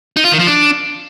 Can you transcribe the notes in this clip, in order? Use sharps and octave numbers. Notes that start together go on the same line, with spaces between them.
D#4
F4
D#3
F3
D4